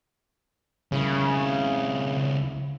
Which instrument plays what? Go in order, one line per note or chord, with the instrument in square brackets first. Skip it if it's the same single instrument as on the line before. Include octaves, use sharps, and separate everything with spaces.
[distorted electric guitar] C#2 E4 [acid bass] C#3